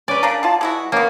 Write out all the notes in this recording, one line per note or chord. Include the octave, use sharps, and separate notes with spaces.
C#4 B4 D5
C#3 D4 A#4
B2 F4 A5
G#3 E4 F#4
A#3 B3 C#4